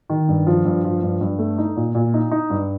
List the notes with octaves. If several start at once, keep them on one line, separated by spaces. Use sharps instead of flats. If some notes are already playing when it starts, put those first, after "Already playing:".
D#3
G2
F3
G2
F3
G2
G2
A3
D#4
A#2
A#2
D#4
D#4
G2